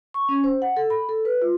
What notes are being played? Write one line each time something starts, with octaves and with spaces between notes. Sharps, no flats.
C#6
C#4
C5
F#5
A4
B5
A4
B4
F4